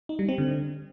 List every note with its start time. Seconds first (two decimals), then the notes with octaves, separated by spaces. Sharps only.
0.09 D#4
0.19 G3
0.29 C4
0.38 D3